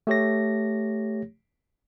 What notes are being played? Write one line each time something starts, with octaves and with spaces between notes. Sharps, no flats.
A3 G4 C#5 A#6